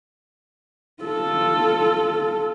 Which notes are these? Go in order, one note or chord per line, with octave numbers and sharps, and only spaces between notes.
F4 A4